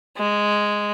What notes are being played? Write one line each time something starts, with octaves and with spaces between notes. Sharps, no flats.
G#3